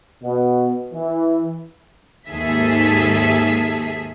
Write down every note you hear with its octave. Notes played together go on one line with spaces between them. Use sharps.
B2
E3
D#2 G#2 G#4 A4 E5 B6